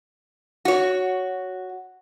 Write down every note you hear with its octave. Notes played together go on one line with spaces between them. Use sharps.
F#4 C#5